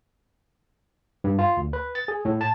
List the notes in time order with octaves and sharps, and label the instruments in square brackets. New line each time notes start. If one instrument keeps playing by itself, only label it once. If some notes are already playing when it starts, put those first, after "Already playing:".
[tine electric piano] G2
F4
D2
B4
A6
G#4
A2
A5